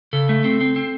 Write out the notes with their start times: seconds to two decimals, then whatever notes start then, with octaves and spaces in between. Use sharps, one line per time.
0.13 C#3 A4
0.29 A3
0.44 C4
0.61 C4
0.76 C4